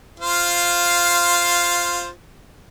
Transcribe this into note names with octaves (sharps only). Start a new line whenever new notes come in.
F4 C5 F5